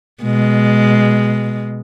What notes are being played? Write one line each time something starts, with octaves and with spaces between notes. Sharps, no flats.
B2 G#3